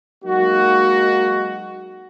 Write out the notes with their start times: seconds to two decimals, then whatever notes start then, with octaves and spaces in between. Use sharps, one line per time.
0.24 F#3 G#3 A#3 D#4 F#4